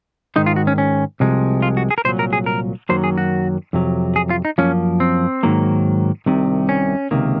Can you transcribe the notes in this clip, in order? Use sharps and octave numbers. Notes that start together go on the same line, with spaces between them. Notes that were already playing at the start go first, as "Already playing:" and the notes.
G#2 D#3 G#3 D#4
F4
F#4
C#4
C#4
C2 C3 F3 G#3
F4
F#4
G#4
A#4
C2 A#2 F#3 C5
A#4
G#4
A#4
F#2 D#3 F#3 A#3 C5
G#4
F#4
F2 C3 F#3
G#4
F4
D#4
F#2 F3 A#3 C#4
C4
G#2 D#3 F#3 A#3
C2 C3 D#3
C#4
C#2 C3 D#3 A#3